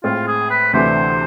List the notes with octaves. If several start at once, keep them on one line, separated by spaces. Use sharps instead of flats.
A2 G#3 C4 F4
G#4
B4
D2 C3 E3 A3 D4 C5